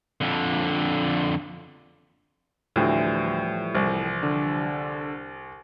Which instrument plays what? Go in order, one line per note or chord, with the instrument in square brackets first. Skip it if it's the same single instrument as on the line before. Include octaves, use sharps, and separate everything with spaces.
[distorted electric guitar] F2 D3
[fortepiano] D2 [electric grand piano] A2 [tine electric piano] E3 F3 G3
[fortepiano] C2
[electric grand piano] D3